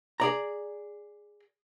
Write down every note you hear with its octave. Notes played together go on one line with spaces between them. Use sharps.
G#4 D5 A#5